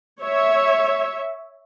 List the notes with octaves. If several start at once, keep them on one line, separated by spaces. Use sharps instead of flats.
C#5 E5